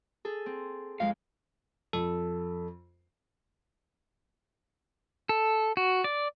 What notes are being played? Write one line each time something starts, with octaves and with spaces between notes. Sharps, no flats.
G#4 A4
C4
F2 G#3 F5
F2 A4
A4
F#4
D5